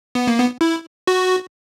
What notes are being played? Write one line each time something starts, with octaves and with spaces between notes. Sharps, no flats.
B3
A#3
B3
E4
F#4